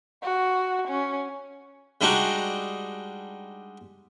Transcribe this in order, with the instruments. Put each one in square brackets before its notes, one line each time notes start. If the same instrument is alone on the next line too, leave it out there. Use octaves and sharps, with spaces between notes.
[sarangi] F#4
C#4
[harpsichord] G3 G#3 D4 D#4 F#4